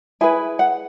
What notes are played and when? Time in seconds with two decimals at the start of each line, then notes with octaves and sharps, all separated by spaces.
0.21 E4 G#4 B4 G#5
0.59 F#5